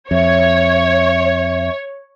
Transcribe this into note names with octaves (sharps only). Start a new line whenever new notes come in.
F2 C#5 E5